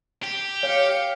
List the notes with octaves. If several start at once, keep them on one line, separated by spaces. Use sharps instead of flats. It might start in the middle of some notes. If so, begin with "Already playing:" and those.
G4
C#5 F5 G5 C#7